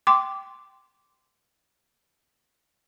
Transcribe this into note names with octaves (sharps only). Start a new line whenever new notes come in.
G5 C6 D6